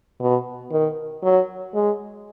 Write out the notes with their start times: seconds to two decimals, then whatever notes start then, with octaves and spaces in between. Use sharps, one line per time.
0.20 B2
0.71 D#3
1.23 F#3
1.74 G#3